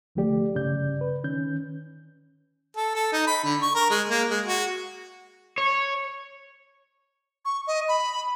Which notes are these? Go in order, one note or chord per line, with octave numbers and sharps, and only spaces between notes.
C2 D3 F3 A3 G4 D5
G2 C#3 D5 G6
B4
D#3 C#4 G6
A4
A4
D#4
B5
D3
C#6
A#4
G#3
A#3
G#3
F#4
C#5
C#6
D#5
B5